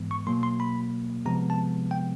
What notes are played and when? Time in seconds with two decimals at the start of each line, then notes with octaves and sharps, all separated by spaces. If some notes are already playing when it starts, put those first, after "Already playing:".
Already playing: G#2 E3 G#3 B3
0.11 C#6
0.27 B2 F#3 A#3 C6
0.43 C6
0.60 B5
1.26 C3 F3 G#3 B3 A#5
1.50 A5
1.91 G5